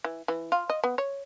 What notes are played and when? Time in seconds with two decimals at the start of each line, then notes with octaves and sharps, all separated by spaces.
0.04 E3
0.28 E3
0.52 F4
0.70 D#5
0.84 B3
0.98 C#5